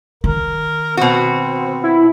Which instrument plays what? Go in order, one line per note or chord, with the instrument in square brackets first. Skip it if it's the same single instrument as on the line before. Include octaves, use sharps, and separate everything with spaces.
[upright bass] D#3 [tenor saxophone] A#4
[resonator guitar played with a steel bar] B2 F#4 [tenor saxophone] C4
[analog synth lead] E4